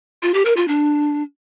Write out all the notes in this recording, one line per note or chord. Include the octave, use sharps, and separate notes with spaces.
F4
G4
A#4
F4
D4